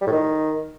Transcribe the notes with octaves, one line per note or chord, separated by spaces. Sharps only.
G3
A2
D#3